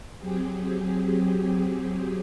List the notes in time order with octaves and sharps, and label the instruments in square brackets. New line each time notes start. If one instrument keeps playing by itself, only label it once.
[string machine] F#3 C4 G4 G#4